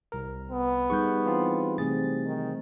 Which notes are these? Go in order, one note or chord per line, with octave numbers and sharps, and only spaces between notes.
C2 A#4
B3
G3 D#4 G#4 C#6 F#6 G6
E3 C4 F4
C3 E3 A3 C4 G#4 A6
D#3